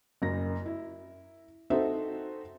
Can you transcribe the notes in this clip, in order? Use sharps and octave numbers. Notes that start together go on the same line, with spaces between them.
F#1 F#2 A#6
E4
C4 D#4 F#4 A4 E5